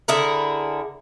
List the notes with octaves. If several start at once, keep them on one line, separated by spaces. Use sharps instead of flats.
D3 E4 G#4 A#4